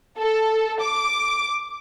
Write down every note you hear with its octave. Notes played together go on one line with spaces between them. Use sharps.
A4
D6